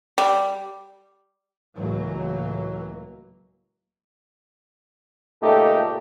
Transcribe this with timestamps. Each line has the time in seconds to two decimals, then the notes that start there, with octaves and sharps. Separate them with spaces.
0.18 G3
1.76 C#2 A2 E3 F#3 A#3
5.43 C#2 A#2 A3 D#4 G4 A4